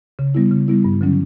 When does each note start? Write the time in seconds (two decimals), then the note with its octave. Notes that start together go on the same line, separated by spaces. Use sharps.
0.19 C#3
0.34 G3 B3 E4
0.51 C#3
0.68 G3 B3 E4
0.85 G2
1.01 D3 F#3 C#4